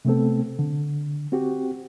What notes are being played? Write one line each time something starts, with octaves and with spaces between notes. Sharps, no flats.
C3 A3 B3 C4 A4
D3
C4 F#4 G4